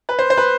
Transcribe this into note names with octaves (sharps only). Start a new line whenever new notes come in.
B4
C5
C5
B4